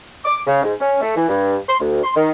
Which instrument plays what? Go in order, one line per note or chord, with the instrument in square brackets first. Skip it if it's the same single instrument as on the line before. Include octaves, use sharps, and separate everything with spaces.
[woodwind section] D6
C#3
G#2
C#4
A3
E3
G2
C6
D2
C6
D#3